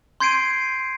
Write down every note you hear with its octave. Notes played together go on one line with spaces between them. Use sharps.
C6 G6 G#6 C7 D7 D#7